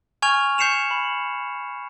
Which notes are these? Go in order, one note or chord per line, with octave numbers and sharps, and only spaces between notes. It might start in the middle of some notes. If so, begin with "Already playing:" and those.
G#5 C#6 F6 G#6 F7
C#6 G6 C7 C#7 E7 F7
B5